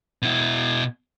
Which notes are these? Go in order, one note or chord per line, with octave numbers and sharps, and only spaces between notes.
B2 E4